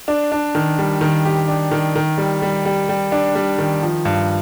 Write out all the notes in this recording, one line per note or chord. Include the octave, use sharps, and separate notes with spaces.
D4
D4
D#3
G3
D#3
G4
D4
D#3
D#3
G3
G3
G3
G3
D4
G3
D#3
F3
G2